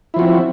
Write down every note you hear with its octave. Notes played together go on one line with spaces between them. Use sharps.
F3 C4 E4 F#4